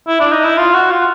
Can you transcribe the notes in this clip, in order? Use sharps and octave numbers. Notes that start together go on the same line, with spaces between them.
E4
D4
D#4
E4
F4
F#4
F4